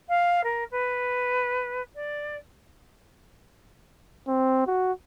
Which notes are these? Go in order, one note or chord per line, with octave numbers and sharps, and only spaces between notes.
F5
A#4
B4
D5
C4
F#4